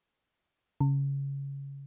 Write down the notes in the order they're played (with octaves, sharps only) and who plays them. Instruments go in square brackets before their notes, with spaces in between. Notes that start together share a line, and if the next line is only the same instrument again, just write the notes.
[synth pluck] C#3